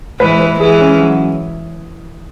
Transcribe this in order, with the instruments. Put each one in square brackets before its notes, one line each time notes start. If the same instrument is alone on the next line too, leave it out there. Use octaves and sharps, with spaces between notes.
[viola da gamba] E3 G#3 [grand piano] B4
[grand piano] B4
[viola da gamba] E3 G#3 [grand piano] G#4
[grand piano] C#4
F#3